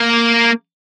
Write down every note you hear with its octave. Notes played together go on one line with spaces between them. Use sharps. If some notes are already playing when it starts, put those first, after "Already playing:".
Already playing: A#3